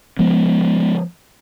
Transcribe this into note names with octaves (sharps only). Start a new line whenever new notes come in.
F3 G#3 B3